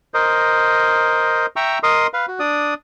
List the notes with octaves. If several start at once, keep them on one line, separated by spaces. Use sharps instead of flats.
A#4 C5 D#5
E5 G5 A#5 C#6 E6
A#4 D#5 C6 D#6
B4 F5
F#4
D4 D5 D#6